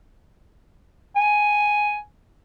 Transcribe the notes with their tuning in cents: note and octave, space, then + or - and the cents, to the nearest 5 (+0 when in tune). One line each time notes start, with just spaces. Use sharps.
G#5 +5